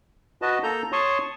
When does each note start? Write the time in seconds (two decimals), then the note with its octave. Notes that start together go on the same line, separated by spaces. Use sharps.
0.42 F#4 B4 D#5 A5
0.63 A#3 A4 A#5 G6
0.92 C#5 A5 C6 C#6 D#6